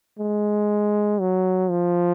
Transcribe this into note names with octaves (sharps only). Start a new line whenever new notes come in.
G#3
F#3
F3